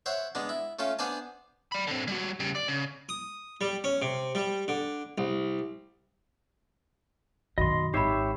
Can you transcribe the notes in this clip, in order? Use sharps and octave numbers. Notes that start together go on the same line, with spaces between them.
C5 C#5 E5 F#5
G#3 B3 D4
E4
A3 C#4 F4 A4
B3 D4 C5 D5 G#5 A5
D5 B5
D3 C4
G3 F#4
C#3 G3
D5
C#3
D#6
G3
C#4
C3
G3
D3
C2
F#2 B2 D#3 F#4 D#5 B5 C6
G#1 D#4 G4 C#5 E5 B5 C7